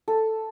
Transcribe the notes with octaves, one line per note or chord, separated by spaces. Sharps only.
A4